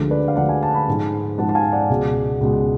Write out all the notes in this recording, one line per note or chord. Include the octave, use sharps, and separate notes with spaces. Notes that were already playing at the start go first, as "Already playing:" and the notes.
Already playing: D2 D3 F3 G#3
B4 D5
F5
D2 D3 F3 G#3 D5 F#5
F5 G#5
A5
G#5 B5
G#2 F3 G#3
G#2 F3 G#3 F#5 A5
A5
F5 G#5
D5 F#5
C#2 B2 G#3
C#2 B2 G#3